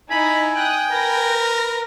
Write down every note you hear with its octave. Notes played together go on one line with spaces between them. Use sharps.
D#4 E4 G#5 A#5 B5
G5 D#6 F#6
A#4 B4 A#6